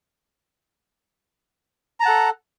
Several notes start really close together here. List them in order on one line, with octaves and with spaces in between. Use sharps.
A#5 A5 F#5 A4